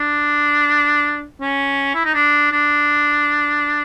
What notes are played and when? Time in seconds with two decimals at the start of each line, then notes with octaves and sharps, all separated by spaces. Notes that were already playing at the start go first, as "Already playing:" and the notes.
Already playing: D4
1.41 C#4
1.95 E4
2.05 D#4
2.14 D4
2.52 D4